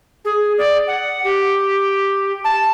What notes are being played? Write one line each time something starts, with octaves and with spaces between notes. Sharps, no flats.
G#4
D5
F#5
G4
A5